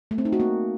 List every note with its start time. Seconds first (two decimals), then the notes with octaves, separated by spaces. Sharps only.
0.11 A3
0.18 C4
0.25 D#4
0.32 F#4
0.40 A#3